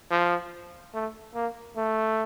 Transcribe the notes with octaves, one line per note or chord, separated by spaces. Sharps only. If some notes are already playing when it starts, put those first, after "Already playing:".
F3
A3
A#3
A3